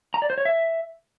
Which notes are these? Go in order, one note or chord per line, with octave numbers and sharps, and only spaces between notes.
A#5
D5
C5
C#5
E5